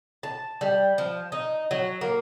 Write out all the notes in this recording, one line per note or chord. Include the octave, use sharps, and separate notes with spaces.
A5
G3
F3
D#4
F#3
A#3